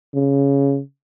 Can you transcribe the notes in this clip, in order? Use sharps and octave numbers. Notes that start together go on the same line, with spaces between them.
C#3